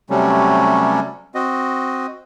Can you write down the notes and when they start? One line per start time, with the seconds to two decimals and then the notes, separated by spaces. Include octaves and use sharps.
0.10 C3 F#3 G3 A3 C#4
1.35 C4 F#4 D#5